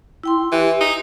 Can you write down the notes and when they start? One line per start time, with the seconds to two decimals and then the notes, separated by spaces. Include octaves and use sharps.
0.23 E4 G5 C6
0.52 E3 G4
0.81 D#4